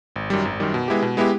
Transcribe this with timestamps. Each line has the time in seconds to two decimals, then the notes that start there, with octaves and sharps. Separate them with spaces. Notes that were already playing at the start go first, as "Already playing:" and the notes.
0.16 G#1
0.30 F#2 D#3 G3
0.45 G#1
0.60 F#2 D#3 G3
0.74 B2
0.88 G#3 B3 E4 G4
1.02 B2
1.17 G#3 B3 E4 G4